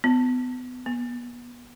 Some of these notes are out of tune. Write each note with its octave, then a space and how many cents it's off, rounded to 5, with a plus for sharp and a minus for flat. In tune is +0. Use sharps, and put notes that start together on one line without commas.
B3 +30
B3 -35